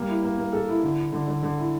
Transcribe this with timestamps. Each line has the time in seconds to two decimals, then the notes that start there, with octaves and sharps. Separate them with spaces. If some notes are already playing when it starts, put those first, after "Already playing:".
Already playing: G3 A#3
0.08 E4
0.23 A#3
0.38 A#3
0.53 A4
0.69 E4
0.83 D3
0.98 E4
1.12 D3
1.27 D3
1.43 D3
1.58 E4